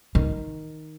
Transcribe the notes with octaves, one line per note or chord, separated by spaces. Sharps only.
D#3